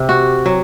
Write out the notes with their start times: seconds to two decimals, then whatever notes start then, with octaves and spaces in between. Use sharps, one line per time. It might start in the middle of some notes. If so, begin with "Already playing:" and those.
Already playing: C3 G4
0.09 F#4
0.46 F#3